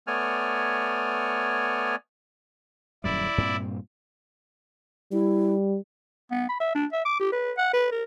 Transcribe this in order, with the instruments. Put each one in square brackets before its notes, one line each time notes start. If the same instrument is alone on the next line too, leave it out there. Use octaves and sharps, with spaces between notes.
[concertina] A3 B3 C#5 D5 G#5 F6
[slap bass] D#1 F#2 G3 [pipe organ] E4 D5
[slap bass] G2 A#2 C4
[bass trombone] G3 [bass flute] E4
[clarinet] B3
B5
E5
D4
E5
D6
G4
B4
F#5
B4
A#4